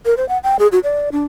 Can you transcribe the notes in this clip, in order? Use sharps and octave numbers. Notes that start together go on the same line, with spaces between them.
A#4
C5
F#5
G5
G#4
F#4
D5
D4